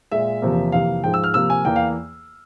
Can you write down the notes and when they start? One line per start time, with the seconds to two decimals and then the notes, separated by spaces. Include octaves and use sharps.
0.12 A#2 G#3 E5
0.42 E2 C3 F3 A#3
0.72 F2 C3 E3 A#3 F5
1.04 G#2 F3 G#3 G5
1.14 E6
1.24 F6
1.34 C3 F3 A#3 E6
1.50 G#5
1.65 E2 E3 A#3 G5
1.76 F5